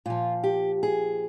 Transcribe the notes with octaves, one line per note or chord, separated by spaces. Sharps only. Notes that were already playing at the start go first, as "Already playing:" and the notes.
A#2 F3 F4
G4
G#4